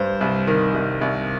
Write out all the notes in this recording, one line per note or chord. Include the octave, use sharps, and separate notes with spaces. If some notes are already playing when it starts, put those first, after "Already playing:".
Already playing: G2 C5
C2
D#3
C2
C2